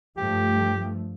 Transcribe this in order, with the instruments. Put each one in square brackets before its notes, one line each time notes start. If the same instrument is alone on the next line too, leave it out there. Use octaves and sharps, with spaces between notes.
[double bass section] G2 F3 A3 [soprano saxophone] G4